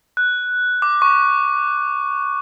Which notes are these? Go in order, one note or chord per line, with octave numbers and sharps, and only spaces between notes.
F#6
D6
C#6